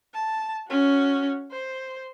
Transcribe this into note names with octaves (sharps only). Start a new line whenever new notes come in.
A5
C#4 F#4
C5